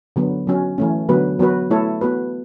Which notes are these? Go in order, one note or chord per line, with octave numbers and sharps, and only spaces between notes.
D3 F#3 B3
F#3 C#4 F#4
E3 A3 C#4
D3 F#3 B3 F#4 B4
F#3 B3 F#4 B4
A3 E4 A4 C#5
B3 F#4 B4